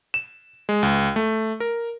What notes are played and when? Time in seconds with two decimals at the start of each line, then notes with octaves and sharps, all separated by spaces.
0.14 E7
0.69 G#3
0.83 C#2
1.16 A3
1.60 A#4